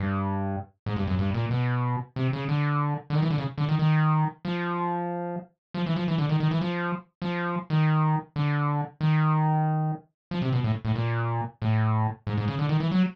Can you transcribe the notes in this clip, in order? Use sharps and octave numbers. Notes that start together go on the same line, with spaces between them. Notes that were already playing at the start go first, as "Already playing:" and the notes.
Already playing: G2
G#2
G2
F#2
G2
A#2
B2
C3
C#3
D3
D3
D#3
E3
D3
C#3
D3
D#3
D#3
F3
F3
E3
F3
E3
D3
D#3
D#3
E3
F3
F3
D#3
D3
D#3
F3
C3
B2
A2
A2
A#2
A2
G#2
G#2
C#3
D3
D#3
E3
F#3